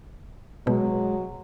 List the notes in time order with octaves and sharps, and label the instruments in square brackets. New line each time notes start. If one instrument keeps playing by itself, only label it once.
[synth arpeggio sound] B2 [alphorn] F#3 [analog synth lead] G#3